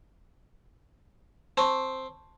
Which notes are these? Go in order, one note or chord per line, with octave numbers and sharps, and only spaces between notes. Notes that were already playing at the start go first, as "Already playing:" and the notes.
C4 A5 C#6